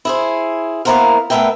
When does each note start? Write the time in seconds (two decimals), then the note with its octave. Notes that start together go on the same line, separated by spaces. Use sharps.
0.05 E4 G#4 C5
0.85 A#3 B3 E4 A#4 C5 F5
1.30 A3 B3 A#4 B4 E5 G5